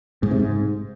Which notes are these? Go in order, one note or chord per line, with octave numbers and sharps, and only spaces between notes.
G#2
C3
G#2